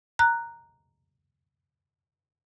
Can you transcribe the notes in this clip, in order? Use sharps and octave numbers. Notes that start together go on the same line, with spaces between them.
A#5 F#6